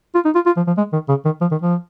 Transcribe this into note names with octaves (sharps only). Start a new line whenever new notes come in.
F4
D#4
F4
F4
F3
F3
G#3
D#3
C#3
D#3
F3
D#3
F3